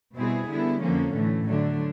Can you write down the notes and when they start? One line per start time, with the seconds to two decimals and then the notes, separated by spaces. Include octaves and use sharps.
0.15 B2 G3 C4 E4 G#4
0.48 D3 G3 B3 E4
0.82 F2 D3 F3 A#3 C#4
1.14 A2 E3 A3
1.48 D3 F#3 A3 D4